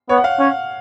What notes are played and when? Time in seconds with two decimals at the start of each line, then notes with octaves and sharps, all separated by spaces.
0.09 B3 C#5
0.17 F#5
0.24 F5
0.39 C#4